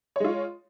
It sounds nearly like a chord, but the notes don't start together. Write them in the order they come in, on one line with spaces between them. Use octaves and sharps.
C#5 G#3 F4